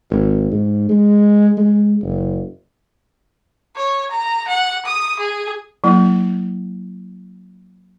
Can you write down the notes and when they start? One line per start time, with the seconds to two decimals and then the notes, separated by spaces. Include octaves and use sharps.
0.11 G#1
0.52 G#2
0.89 G#3
1.57 G#3
2.03 F#1
3.76 C#5
4.11 A#5
4.48 F#5
4.86 D#6
5.19 G#4
5.84 F#3 A#3 E4